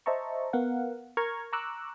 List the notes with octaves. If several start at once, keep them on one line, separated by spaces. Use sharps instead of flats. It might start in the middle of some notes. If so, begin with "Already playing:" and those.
C5 D#5 E5 A5 A#5 C#6
B3 A#4 F5 F#5
A#4 A#5 C#6 F6 G#6
A#5 C#6 D6 E6 F#6